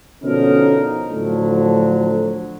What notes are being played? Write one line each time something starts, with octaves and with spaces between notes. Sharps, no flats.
B2 D3 F3 C#4 D#4 A#4
A2 D3 F3 F#3